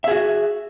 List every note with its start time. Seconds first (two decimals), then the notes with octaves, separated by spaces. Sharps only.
0.04 E5
0.08 G#4
0.11 F#4